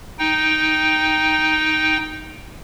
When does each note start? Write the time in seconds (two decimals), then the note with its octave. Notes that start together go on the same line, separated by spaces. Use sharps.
0.19 D#4 G5